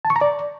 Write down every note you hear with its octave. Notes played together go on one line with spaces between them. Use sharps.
A5
C#6
A#5
D5